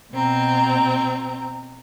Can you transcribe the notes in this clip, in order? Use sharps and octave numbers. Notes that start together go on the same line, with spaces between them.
B2 C4 A#5